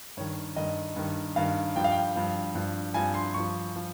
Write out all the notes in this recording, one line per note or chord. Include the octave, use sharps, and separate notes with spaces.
G2 D#3 C#5
G2 D#3 D#5
G2 D#3
G2 D#3 F5
G2 F3 G5
F5
G5
G2 F3
G2 F3
G2 F3 G#5
C6
G2 F3 C#6
F3